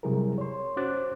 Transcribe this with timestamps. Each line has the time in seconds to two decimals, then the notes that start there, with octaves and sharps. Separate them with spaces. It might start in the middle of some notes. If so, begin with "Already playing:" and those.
0.03 C3 F#3 G3 E4 G#4 A#4
0.38 C#5 C6
0.77 C#4 F#4 C5 D6 F#6 A6